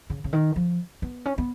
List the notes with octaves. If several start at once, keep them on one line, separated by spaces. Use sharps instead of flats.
C#3
C#3
D#3
F3
B3
C#4
B3